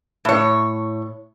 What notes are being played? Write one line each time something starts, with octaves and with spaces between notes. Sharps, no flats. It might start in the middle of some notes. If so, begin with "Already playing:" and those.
A2 C#5